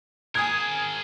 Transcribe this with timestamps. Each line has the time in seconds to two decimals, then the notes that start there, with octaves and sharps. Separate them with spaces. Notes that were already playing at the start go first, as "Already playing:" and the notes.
0.35 G#4 A#4 G#5 D#6 G#6